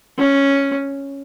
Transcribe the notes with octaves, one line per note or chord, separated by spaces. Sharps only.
C#4